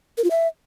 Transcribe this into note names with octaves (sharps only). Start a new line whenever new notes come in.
A#4
F4
E5